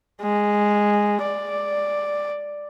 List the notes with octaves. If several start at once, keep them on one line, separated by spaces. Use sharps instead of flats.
G#3
D5